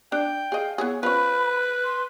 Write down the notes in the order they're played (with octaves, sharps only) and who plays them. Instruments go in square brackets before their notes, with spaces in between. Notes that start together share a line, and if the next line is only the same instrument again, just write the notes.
[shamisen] D4 [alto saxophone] G5
[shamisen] G#4 D#5 [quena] F5
[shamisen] B3 E4 G#4 [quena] C#5
[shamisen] F3 C#4 [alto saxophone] B4 [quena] B5
[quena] C6